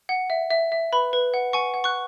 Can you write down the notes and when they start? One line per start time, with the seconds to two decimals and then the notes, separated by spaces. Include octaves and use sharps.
0.09 F#5
0.30 E5
0.51 E5
0.72 E5
0.92 B4 B5
1.13 B4
1.34 F#5
1.53 F#5 G#5 C#6
1.74 F#5
1.84 C#6 F#6